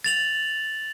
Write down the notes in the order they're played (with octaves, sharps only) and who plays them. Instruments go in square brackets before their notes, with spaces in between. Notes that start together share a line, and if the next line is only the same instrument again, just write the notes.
[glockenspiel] A6 F7 F#7